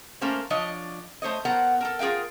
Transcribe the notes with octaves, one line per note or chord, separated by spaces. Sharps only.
A3 A#3 C#4 C5
F3 D4 C#5 D#5
A3 C5 C#5 D#5
B3 A#4 C5 F#5
A4 A#4
F4 G#4 A#4 F5 G5